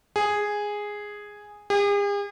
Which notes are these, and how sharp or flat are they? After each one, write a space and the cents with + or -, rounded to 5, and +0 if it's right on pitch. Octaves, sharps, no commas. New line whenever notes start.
G#4 -5
G#4 -45